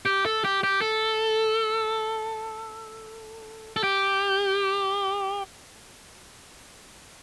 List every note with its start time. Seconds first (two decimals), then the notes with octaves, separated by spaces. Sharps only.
0.06 G4
0.26 A4
0.45 G4
0.63 G4
0.81 A4
3.76 A4
3.84 G4